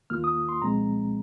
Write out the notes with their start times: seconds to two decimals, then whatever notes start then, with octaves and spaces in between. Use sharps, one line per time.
0.10 D#2 D#3 A#3 F4 F6
0.24 D#6
0.49 C6
0.62 C2 A#2 F3 G#3 C4 A#5